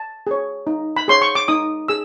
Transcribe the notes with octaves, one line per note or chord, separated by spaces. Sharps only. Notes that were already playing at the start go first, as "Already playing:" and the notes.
Already playing: A5
G#4 C#5
D#4
B5
G#4 C#5 C6
C#6
D6
D#4 D#6
G#4 E6